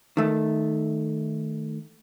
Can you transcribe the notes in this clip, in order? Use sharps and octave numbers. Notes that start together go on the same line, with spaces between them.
D#3 A3